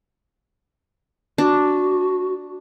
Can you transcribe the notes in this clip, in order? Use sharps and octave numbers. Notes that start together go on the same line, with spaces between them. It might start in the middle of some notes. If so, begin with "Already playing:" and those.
D4 F#4